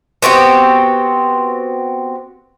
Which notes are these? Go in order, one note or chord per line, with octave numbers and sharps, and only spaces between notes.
B3 C4 F#4 G4